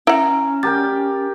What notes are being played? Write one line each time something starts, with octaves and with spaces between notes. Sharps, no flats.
C#4 E4 F#5 A#5
G4 A#4 G5 A6